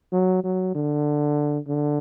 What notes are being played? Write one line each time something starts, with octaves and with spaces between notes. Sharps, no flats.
F#3
F#3
D3
D3